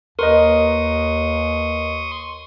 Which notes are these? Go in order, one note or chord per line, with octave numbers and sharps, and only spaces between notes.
D#2 A#4 B4 D#5 C6 C#6 D#6